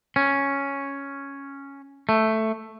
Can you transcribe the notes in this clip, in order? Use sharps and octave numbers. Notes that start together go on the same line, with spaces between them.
C#4
A3